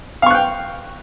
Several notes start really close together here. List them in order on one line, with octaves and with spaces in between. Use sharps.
F5 C#6 F#6 G5